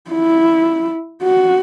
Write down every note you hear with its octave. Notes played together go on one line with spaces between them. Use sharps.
E4
F#4